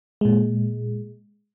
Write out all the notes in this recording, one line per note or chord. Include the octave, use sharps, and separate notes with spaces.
A#2 G#3